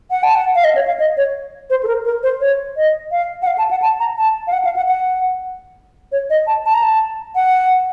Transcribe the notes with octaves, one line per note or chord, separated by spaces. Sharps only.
F#5
A5
F#5
F5
D#5
C#5
F5
D#5
C#5
C5
A4
A#4
A#4
C5
C#5
D#5
F5
F#5
F5
A5
F#5
A5
A#5
A5
F5
F#5
F5
F#5
F#5
C#5
D#5
A5
A5
A#5
A5
F#5